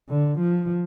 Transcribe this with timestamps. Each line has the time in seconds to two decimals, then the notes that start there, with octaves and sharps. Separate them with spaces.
0.09 D3
0.40 F3